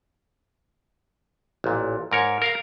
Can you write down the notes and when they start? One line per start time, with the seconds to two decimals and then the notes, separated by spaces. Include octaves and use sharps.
1.64 A1 A#2
2.12 G#2 A#4 C#5
2.42 A#4 F5 A#5